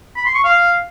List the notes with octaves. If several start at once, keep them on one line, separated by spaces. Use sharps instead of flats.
B5
C6
C#6
F5